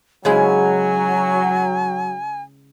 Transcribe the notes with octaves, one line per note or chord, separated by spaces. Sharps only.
C#3 F#3 G#3 E4 G#5